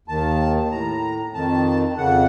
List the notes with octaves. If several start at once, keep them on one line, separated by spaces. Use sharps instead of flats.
D#2 D#3 A5
A2 A#5
F2 D#3 A5
F2 C#3 F#5